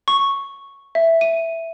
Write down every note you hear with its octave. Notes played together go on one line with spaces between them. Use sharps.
C#6
E5
D#7